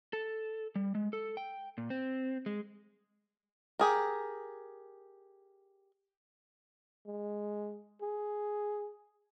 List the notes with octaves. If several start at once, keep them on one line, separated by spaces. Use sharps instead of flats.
A4
G3
G#3
A4
G5
A#2
C4
G#3
G4 G#4 A#4
G#3
G#4